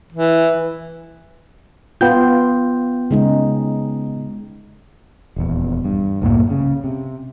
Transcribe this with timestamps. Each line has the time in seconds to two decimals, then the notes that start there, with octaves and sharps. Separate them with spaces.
0.12 E3
2.01 B3 F4 G5 G6
3.11 C#3 G#3 D#4
5.36 D#1 E2
5.85 G2
6.22 C2 F#2 A2 A#3
6.50 C#3
6.84 C3